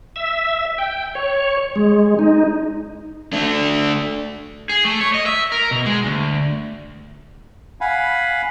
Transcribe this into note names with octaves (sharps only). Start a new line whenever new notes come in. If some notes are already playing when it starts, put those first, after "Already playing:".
E5
G5
C#5
G#3
D#4
A3 D4
G#4
A3
C#5
D#5
E5
A#4
B2
G#3
D2
F5 F#5 G#5 B5